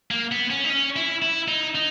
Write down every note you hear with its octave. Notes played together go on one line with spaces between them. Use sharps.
A#3
B3
C#4
D#4
C#4
E4
E4
D#4
D#4